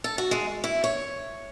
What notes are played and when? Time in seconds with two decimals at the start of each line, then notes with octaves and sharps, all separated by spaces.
0.04 A4
0.18 F#4
0.31 G#3
0.64 E4
0.84 C#5